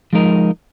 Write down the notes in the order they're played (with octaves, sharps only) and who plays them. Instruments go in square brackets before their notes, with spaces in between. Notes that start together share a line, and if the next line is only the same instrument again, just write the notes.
[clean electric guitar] F3 G#3 D#4 A#4 D#5